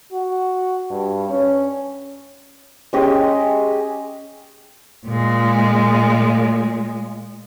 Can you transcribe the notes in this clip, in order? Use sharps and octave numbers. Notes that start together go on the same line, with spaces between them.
F#4
G2
C#4
G#3 C#4 G4 D#5
A#2 G#3